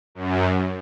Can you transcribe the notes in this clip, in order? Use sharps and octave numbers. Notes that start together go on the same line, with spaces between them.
F#2